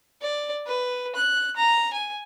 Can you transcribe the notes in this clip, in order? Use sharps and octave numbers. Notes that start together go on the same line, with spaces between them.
D5
B4
F#6
A#5
G#5